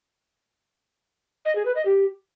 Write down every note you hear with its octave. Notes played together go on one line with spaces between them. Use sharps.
D#5
G#4
B4
D#5
G4